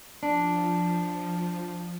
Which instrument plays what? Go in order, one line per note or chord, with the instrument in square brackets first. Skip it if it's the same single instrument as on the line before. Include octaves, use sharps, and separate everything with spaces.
[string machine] F3 [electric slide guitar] D4